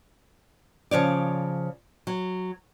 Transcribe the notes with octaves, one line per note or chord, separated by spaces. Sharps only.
C#3 F3 C#5 D5
F#3